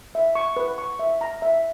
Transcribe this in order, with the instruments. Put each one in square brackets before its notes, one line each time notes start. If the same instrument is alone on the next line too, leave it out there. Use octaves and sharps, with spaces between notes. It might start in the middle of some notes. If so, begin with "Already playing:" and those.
[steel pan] E5
C#6
B4
C#6
E5
A#5
E5